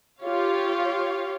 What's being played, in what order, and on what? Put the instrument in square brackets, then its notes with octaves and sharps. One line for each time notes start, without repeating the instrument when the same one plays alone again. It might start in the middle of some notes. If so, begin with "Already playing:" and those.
[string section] F4 G4 C#5 F5